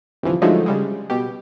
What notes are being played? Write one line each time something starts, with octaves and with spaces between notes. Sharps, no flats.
G1 C2 E3 F3
D3 F3 F#3 G#3 A3 D#4
C#3 G3 G#3
B2 G4